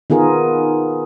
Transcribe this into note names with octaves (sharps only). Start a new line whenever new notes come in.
D#3 B3 F4 G#4 A#4